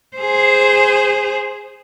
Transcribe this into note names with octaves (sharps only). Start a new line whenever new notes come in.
G#4 C5